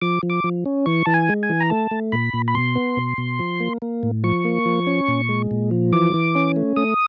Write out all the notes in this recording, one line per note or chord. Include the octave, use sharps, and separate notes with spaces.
F3 D6
F3
D6
F3
C#4
E3 C#6
E3 A5
G#5
G#3
G#5
E3
A#5
A3 A5
A3
A#2 B5
A#2
B5
B2 C6
B3
B2
B2
F3
A#3
A#3
A2
F3 C#6
A#3
F3
C#4
A#2
G#3
A#2
F3
E3 D6
E3
C#4
A3
A3 D#6